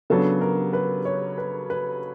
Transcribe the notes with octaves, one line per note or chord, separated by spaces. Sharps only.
C#3 F#3 B3 D4 A4
A#4
B4
C#5
B4
B4